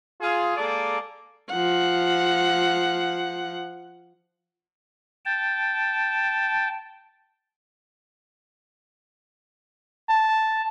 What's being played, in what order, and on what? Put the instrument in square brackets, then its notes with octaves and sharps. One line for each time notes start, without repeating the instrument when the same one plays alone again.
[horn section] F4 G#4
G#3 A#3 A4 D5
[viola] F3 F#5
[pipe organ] G5 A5
[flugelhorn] A5